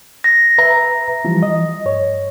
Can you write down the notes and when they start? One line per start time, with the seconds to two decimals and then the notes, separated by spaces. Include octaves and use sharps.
0.24 A#6
0.58 B4 E5 A#5
1.25 E3 F3 G3
1.43 D#5
1.85 G2 C#5